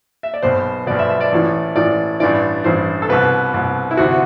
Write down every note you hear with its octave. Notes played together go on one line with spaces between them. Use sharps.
E5
D5
B1 B2 C5
B1 B2 D5
E5
E5
D5
A1 A2 E3
A1 A2 E3 D5
A1 G2 E3 D5
A1 G2 E3 C5
A4
C2 B2 B4
C2 B2
E4
D2 C3 E3 F#4